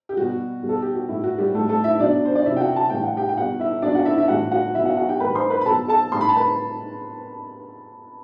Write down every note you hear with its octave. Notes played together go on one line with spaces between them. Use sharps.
G4
B2 G3 F#4
B2 G3
A4
G4
F#4
A2 F#3 E4
F#4
G3 G4
A2 F#3 A3 A4
A3 A4
E4 E5
B2 F#3 D4 D5
C5
D5
C3 F#3 E4 E5
G5
F#4 F#5
A5
A2 E3 G3 G5
F#5
G4 G5
G5
B2 G3 F#4 F#5
E4 E5
B2 F#3 D4 D5
F#4 F#5
E4 E5
E4 E5
A2 E3 G3 F#4 F#5
F#4 F#5
B2 F#3 E4 E5
F#4 F#5
F#4 F#5
G4 G5
A2 E3 G3 B4 B5
C5 C6
B4 B5
B5
B2 F#3 A4 A5
A4 A5
A2 G3 C6
B5
A5
B4 B5